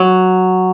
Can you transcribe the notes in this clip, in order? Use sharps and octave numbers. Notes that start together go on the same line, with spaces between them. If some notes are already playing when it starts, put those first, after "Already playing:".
Already playing: F#3